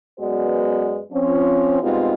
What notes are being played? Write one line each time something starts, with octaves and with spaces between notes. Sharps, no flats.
F#2 G#3 B3 F#4 B4 D5
F3 C4 C#4
B2 G3 G#3 C4 D#4 F4